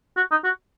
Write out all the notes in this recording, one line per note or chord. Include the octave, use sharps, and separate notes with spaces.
F#4
D#4
F#4